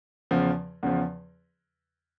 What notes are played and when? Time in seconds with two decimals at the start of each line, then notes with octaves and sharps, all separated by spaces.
0.31 E2 C#3 F3
0.83 E2 C#3 F3